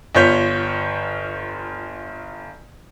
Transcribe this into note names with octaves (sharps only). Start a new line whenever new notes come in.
G1 F4 C#5 G6 B6